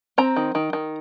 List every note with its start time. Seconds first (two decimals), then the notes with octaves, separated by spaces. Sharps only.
0.18 C4 A#5
0.36 D#3
0.55 D#3
0.73 D#3